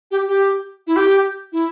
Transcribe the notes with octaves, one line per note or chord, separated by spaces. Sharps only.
G4
G4
E4
G4
E4